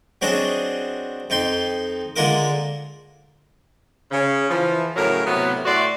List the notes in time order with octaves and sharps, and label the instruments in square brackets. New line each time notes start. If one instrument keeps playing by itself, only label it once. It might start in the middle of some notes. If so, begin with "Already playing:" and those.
[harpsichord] F#3 C4 D4 G#4 C5 D#5
F2 D#4 G5 C6
D3 G#3 A#3 F4 A#4 D6
[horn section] C#3
E3 F3
A2 C#3 F#3 A#4
A2 C3 F#3 B3
A2 A3 F#4 D5 C6